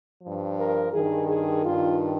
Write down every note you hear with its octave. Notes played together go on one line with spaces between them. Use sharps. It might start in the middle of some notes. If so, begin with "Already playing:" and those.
G2 F3
A#4
G2 D#3 G#4
G#4
G2 D#3 F4